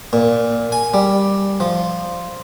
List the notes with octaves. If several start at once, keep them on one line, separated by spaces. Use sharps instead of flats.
A#2
G#5
G3
F3